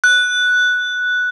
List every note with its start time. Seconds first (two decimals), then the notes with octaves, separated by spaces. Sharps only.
0.04 F#6